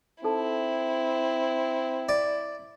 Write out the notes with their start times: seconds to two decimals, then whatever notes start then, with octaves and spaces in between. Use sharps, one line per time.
0.24 C4 D#4 E4 A4 A5
2.09 D5